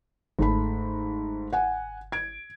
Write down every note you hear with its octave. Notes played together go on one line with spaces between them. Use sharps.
G1 G#2 A3 B5
F#5 G#5
G#6 D7